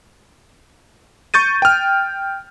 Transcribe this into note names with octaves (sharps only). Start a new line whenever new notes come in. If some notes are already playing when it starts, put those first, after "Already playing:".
C#6 G6 A6 D#7
G5 F6